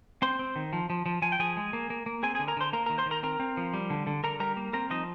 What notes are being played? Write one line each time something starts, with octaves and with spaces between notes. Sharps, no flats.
C4 C5 C6
C4
D#3
F3
F3
F3
F3 G#5
G5
F3 G#4 G#5
G#3
A#3
A#3
A#3
C4 G#4 G#5
G#4 G#5
D3
A#4 A#5
D3 C5 C6
A#3 A#4 A#5
D#3 A#4 A#5
C5 C6
D#3
A#4 A#5
C4 A#4 A#5
C4
F3
G3
D3
D3
D3 A#4 A#5
G3 A#4 A#5
A#3
C4 A#4 A#5
F3 D#4 D#5